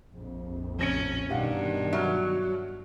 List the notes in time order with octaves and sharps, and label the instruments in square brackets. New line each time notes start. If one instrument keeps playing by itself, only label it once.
[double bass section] A#1 F2
[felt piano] F1 A#6 C#7 [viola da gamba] C#4
[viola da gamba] G2 [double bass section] B2 D#3 [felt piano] G4 F5 F#5
[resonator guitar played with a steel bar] F#3 [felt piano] E5 F6